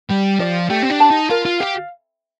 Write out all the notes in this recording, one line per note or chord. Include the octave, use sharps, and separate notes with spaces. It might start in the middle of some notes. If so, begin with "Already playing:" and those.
G3 G4
F3 D5
A3 G4
C4
D4
A5
D#4
F4 A#4
F4
G4 F5